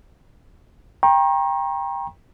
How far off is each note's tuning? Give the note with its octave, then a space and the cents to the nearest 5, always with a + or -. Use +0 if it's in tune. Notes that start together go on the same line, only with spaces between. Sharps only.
G5 +15 A#5 +25 C#6 -35